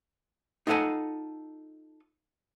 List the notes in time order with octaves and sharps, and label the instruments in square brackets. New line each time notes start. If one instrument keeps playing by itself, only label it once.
[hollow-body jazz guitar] D#4 F4 A4 F5 F#5 G#5